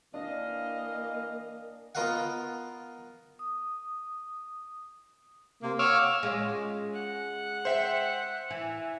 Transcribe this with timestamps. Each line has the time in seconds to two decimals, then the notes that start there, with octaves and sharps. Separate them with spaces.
0.14 E3 A#3 D4 D#5 F5
1.95 B3 F4 A#4 D#5 F5 F#5
3.39 D#6
5.63 C3 A#3
5.79 C#5 F5 F#5 C#6 D6 E6 F6
6.23 G#3 C#4 F4
6.93 F#5
7.65 C5 E5 G5
8.50 E3